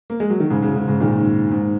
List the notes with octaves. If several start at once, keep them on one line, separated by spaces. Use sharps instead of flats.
A#3
G#3
F#3
D#3
G#2 C#3
G#2 C#3
G#2 C#3
G#2 C#3
A#2 D#3
G#2